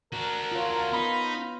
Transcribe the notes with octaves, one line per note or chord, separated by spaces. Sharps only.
D4 F#4 A#4
F4 C#5
B3 D#4 F4 B5